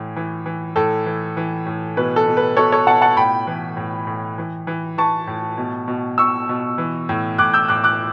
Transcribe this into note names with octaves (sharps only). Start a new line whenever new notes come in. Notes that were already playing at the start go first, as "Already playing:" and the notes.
Already playing: A2 E3
E3
E3
A2 A4
E3
E3
A2
B2 B4
A4
B2
B4
B2 A4 C#5
A4 C#5
B2 F#5 A5
F#5 A5
A2 G5 B5
E3
A2
A2
E3
E3
E3 A5 C#6
A2
B2
B2
B2 C#6 E6
B2
E3
A2
A2 D6 F#6
E6 G6
A2 D6 F#6
D6 F#6